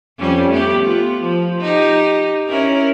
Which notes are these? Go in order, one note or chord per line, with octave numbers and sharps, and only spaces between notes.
F2 G3 C#4
A3 B3 G4
B3 F4
F3
D#4 G4
C#4 E4 A#4